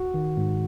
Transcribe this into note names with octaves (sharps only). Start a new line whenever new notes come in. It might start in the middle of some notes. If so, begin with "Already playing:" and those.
Already playing: F#4
D#3
G#2